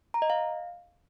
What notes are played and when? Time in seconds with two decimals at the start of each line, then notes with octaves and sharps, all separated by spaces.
0.14 A#5
0.22 D#5
0.30 F5